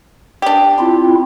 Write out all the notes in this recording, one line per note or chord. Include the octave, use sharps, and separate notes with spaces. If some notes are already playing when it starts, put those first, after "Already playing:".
D4 G4
C4 E4 F4